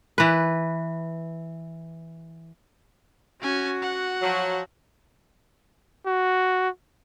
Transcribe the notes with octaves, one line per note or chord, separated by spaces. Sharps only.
E3 B4
C#4 F#4 G#5
F#5
F3 F#3
F#4